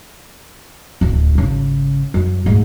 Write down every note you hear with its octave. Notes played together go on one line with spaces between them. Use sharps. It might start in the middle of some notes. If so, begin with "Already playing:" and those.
D1 D2
G#1 C#3
F#2
G#2 A3